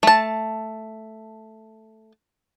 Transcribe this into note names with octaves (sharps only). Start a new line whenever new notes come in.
A3 A5